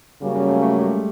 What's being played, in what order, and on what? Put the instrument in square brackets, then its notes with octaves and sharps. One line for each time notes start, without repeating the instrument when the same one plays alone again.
[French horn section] C#3 F#3 A#3 C#4 [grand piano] G3
[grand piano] G3
A3
A3
G3
G#3